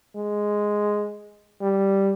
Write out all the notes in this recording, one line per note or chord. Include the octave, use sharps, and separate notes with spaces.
G#3
G3